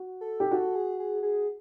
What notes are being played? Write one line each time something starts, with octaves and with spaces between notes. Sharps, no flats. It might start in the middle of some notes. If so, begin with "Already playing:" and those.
Already playing: F#4
A4
G4
F#4 A4
G#4
G#4
G#4